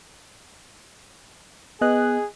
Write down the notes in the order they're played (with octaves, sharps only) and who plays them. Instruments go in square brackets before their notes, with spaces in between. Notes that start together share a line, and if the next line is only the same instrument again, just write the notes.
[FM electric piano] B3 D#5 F#6 [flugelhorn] G#4